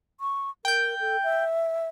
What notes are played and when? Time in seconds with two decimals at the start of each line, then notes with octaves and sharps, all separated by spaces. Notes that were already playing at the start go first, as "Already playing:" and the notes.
0.20 C#6
0.65 A#4 G5 G6
1.00 A4
1.23 E5